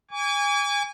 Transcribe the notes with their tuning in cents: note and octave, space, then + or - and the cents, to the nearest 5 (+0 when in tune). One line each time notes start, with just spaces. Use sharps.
G#5 -25 D6 -45